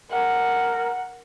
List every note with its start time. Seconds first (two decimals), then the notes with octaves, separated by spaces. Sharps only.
0.11 A#4 F#5